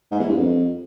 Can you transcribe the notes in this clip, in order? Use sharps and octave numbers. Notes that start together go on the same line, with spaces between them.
G#2
E2
G2
F2